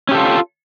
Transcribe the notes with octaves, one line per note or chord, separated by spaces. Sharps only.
C#4 F4 G4 A4